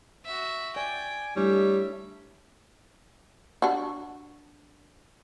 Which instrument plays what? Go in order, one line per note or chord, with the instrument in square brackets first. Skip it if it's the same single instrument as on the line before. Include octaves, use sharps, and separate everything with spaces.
[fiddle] F#4 E5
[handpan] D5 [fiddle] G5 [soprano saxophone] G#5
[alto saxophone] G3 [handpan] A3 D4 E4 [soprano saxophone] C#5 [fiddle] E5
[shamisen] D4 F#4